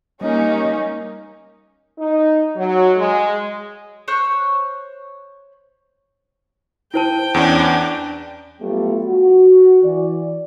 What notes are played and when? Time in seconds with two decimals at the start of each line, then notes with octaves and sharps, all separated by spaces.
0.21 G3 A#3 C#4 D#4
1.99 D#4
2.56 F#3
2.97 G#3
4.08 C5 C#5 C#6 F#6
6.94 E4 C5 G5 A5
7.34 E2 C#4 D4
8.61 F#3 G3 A3 B3 F4 G4
9.04 F#4
9.83 E3 D5